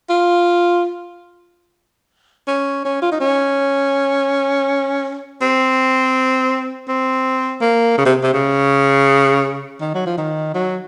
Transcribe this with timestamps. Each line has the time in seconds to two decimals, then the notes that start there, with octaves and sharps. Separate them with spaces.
0.09 F4
2.47 C#4
2.85 C#4
3.02 F4
3.12 D#4
3.21 C#4
5.41 C4
6.88 C4
7.61 A#3
7.98 C#3
8.06 C3
8.23 C3
8.34 C#3
9.81 D#3
9.95 F#3
10.06 F3
10.18 D#3
10.54 F#3